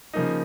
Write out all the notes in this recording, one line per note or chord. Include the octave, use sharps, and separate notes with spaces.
C#3 F3 A#3 D#4